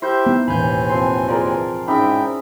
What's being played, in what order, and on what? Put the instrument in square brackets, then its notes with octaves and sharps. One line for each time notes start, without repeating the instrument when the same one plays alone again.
[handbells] E4 G6 [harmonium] G4 E5 [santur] C5
[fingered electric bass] B3 [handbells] D#4
[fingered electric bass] E1 A1 [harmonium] D#2 E3 G#5 [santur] F5 [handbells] B5 G6
[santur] F3 C4 C6
[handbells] F4 [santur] G#4 A#4 D5
[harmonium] G#2 G5 [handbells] C#4 D#4 G#4 [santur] E4 E5